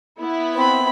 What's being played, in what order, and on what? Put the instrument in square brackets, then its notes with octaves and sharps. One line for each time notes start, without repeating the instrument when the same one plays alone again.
[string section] B3 E4
[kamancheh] C4 B5